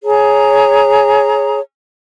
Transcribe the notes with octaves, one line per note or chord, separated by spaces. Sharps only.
G#4 C#5 A#5